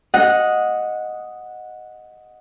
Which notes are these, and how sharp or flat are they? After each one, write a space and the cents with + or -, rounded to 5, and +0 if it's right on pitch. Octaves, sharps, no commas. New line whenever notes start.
D#5 +0 F#5 -15